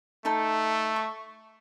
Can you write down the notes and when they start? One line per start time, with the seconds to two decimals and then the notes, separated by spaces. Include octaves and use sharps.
0.25 A3 D#4 A4
0.96 C#6